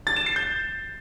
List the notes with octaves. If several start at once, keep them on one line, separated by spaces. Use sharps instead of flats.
A6
E7
C7
G6